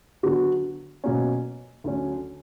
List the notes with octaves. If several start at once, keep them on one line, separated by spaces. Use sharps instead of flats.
D3 F#3 B3 F#4
B2 F#3 A#3 C#4
D2 D3 F#3 C#4